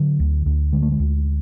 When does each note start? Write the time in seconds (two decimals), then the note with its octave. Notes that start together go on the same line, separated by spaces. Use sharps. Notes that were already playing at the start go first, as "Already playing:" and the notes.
Already playing: D3 F#3
0.20 D2
0.46 D2
0.73 D3 G#3
0.82 A3
0.92 G#3
0.99 D2